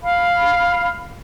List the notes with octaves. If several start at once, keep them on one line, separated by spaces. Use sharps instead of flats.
F5 B5